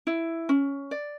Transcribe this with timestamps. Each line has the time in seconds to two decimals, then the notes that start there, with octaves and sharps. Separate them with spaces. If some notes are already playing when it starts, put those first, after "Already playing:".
0.07 E4
0.49 C#4
0.91 D5